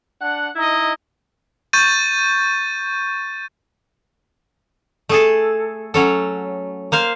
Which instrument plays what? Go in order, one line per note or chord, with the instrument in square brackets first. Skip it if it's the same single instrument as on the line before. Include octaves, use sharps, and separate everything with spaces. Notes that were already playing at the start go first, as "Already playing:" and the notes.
[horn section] D4 F#5
D#4 E4 D#5
[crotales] C#6 G6 A6 D#7
[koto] A3 G#4 A4
F#3 C#4 A4
A#3 C5 F5